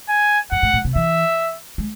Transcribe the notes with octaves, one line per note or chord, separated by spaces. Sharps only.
G#5
F#2 F#5
G#2
A2
C3
E3 E5
G#3